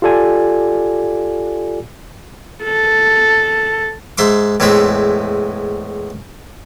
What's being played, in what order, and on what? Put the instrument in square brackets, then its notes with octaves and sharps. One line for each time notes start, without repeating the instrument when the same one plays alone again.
[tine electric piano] F4 G4 A4 D5 G#5
[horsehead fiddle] A4
[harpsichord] G#2 E5 C6 D6
E2 A2 G#3 C4 E5